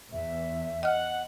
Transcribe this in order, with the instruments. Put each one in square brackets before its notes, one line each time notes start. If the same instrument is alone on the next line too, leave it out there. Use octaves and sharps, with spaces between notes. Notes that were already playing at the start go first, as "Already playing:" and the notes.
[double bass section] E2 [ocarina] E5
[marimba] D#5 F6 [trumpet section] F#5